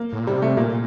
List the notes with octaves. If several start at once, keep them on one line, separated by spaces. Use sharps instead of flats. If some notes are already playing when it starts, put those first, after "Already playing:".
Already playing: A#3
A2
A#2
C3 G3
A3
A#2 A#3